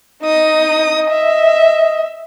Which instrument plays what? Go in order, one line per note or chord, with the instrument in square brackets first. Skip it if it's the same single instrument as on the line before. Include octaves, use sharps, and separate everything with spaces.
[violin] D#4 D#6 [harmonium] D#5
[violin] E5